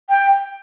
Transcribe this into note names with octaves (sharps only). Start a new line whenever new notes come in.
G5